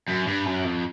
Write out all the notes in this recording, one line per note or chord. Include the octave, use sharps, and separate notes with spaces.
F#2
G2
F#2
F2